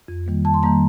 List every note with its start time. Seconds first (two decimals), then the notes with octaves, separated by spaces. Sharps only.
0.08 F2
0.26 D#3 G3 A#3
0.45 F2 A5
0.54 C6
0.62 D#3 G3 A#3 A#5